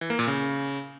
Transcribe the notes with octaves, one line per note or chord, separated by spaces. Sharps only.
E3
A#3
A#2
C#3